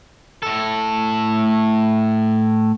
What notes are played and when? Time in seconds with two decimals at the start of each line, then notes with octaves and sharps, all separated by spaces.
0.43 A2 A4